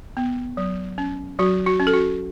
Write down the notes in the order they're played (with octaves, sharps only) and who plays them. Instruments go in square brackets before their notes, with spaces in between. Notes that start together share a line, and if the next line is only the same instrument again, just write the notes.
[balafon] B3
F#3
C#4
F#3 F#4
F#4
C#4
A4
F#4